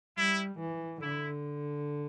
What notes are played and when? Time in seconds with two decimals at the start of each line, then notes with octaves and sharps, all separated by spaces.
0.17 G3 E4
0.60 E3
1.01 D3 E4